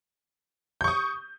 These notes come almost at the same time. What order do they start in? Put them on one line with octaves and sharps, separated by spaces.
G6 C#6 D#6